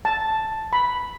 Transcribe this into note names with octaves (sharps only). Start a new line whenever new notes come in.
A5
B5